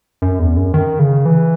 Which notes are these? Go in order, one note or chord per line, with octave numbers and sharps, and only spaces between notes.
F#2
E2
F#2
D#3
C#3
E3